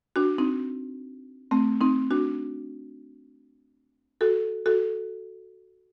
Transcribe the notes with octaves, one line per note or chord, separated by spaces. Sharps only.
D4 F#4
C4 D#4
A3 C4
C4 D#4
D4 F#4
F#4 A4
F#4 A4